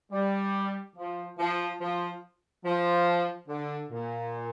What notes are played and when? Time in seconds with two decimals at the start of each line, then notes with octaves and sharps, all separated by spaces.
0.12 G3
0.97 F3
1.39 F3
1.81 F3
2.65 F3
3.49 D3
3.91 A#2